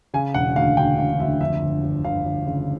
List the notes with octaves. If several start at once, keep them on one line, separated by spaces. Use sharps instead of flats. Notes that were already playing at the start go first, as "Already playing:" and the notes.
C#3 G#5
E1 F#5
D2 F5
D2 G5
E1 F5
D2 E5
F2 E5
G1
G1
G1 F5
G1
C#3